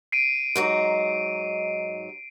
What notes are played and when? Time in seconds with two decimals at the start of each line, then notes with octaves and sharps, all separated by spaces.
0.12 C7 D7 D#7
0.56 G#2 F#3 D#4